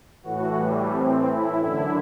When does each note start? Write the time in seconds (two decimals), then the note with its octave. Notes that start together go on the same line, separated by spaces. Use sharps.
0.23 A2 E3 F#4
0.58 G3
0.91 C4
1.26 E4
1.60 F#2 D3 E4